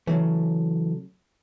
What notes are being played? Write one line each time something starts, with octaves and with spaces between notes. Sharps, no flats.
C#3 E3 F#3 A3